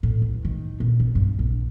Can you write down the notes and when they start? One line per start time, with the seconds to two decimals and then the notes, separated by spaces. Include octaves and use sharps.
0.03 A2
0.22 E2
0.45 D#3
0.80 A#2
1.00 D3
1.15 G2
1.39 A#1